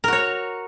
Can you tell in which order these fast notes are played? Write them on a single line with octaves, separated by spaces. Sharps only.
A#4 F#4 C#5